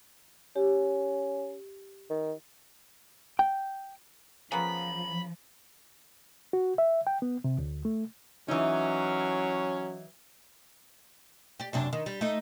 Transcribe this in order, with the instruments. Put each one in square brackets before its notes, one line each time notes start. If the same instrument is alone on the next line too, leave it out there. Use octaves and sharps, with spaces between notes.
[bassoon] C#4 [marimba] G4
[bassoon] D#3
[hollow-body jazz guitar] G5
[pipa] C#3 A#3 B3 [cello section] F3 [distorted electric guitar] B5
[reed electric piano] F#4
E5
G5
B3
C3
D2
A3
[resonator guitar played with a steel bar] E3 D#4 [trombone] F#3 [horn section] C#4
[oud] G4 D5
F#2 C3 D4
D#3
G3
A3 D#4